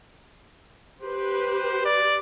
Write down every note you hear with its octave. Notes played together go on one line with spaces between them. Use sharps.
G4 B4 C5
D5